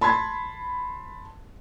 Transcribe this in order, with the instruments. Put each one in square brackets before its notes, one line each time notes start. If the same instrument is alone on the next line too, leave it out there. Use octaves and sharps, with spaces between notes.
[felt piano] A5 B5 C6 G#6